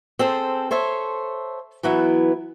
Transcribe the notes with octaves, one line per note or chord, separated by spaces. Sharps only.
C4 G#4 A4 C5
A4 C5 C#5 E5
E3 F#3 B3 E4